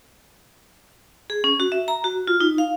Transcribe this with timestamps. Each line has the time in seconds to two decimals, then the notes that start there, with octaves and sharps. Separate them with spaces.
1.30 G#4
1.44 C#4
1.60 F#4
1.72 E5
1.88 A#5
2.04 F#4
2.27 F4
2.40 D#4
2.58 F5